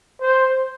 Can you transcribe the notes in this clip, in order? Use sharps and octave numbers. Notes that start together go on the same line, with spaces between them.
C5